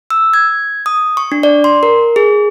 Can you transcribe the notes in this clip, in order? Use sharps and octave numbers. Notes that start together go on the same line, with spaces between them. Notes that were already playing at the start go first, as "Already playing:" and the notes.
E6
G#6
D#6
C#6
D4
D5
C6
A#4
G#4